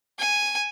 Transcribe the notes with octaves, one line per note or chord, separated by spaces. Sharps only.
G#5